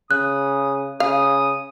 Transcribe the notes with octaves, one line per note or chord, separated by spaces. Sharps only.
C#3 D#6 F#6
C#3 F5 D#6